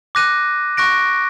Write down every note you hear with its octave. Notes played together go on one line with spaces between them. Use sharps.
D6 F#6 A#6 D#7
C#6 F#6 A#6 D7